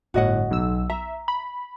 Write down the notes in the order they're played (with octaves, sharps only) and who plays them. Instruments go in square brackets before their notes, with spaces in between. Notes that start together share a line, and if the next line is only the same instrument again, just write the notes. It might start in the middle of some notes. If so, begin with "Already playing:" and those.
[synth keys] G1 A2 [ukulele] F#4 D#5 F#5
[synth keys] B1 E6
[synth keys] E5 [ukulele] A#5
[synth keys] B5